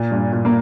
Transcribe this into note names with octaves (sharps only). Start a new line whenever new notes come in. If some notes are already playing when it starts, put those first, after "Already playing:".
Already playing: A#2
G2
A#2
A#3